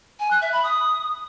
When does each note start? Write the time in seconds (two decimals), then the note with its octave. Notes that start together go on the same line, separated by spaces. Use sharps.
0.20 G#5
0.31 F#6
0.42 E5
0.53 B5
0.64 D#6